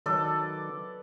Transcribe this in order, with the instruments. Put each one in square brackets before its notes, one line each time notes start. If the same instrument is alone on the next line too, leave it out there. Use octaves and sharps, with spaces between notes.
[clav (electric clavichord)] D#3 F#3 [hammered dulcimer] A4 B4 D5